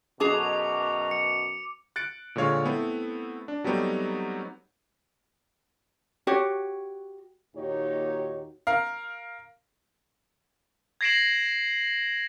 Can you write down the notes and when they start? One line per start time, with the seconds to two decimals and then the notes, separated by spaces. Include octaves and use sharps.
0.20 F#2 B2 F#3 G#4 A5 D6 F7
1.11 C#7
1.96 F#6 A6 C#7 D7
2.36 A#2 D3 G#3 C#5 F5
2.65 A3 B3 C4 E4
3.48 D4
3.64 F#3 G3 A3 B3 C4 D#4
6.27 F#4 G4 C#5
7.56 D#2 A#2 D#4 F#4 G4 C#5
8.67 A#4 F5
11.01 G#6 A#6 C7 D7 E7 F#7